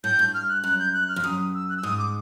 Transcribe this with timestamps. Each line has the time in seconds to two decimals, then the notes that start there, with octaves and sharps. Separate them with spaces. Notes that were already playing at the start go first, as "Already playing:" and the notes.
0.04 A2 G6
0.19 G2
0.34 F6
0.48 F#6
0.64 F#2 F#6
0.79 G6
0.94 F#6
1.09 F6
1.16 F2
1.24 F#2 D#6
1.54 E6
1.69 F#6
1.77 E6
1.83 G#2 D#6
1.99 D6